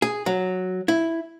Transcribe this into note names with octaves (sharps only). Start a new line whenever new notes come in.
G#4
F#3
E4